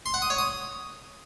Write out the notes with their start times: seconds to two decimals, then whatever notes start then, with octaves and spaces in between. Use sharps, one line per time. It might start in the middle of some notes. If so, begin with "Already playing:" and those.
0.06 C6
0.14 F#5
0.22 D#6
0.30 C#5
0.38 D#6